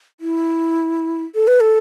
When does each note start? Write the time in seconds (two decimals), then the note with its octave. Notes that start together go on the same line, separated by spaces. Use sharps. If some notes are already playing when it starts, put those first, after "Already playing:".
0.20 E4
1.35 A4
1.47 B4
1.60 A4